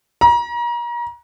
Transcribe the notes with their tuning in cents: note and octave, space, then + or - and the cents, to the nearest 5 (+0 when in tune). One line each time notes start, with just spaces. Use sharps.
A#5 +35